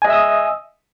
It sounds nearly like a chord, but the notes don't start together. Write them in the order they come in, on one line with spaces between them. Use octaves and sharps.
G#5 D#5 E5 E6 D#6